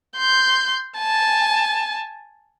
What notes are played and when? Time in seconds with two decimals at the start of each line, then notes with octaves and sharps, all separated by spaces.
0.16 C6 G6
0.98 G#5 A5